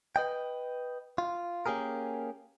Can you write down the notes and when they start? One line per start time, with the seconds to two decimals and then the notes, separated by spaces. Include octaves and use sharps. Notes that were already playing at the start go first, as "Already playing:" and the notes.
0.16 B4 D#5 G5
1.18 F4
1.66 A#3 C#4 G4 G#4 A#4